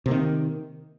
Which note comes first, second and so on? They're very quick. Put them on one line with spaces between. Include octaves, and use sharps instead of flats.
C3 A#3 D#3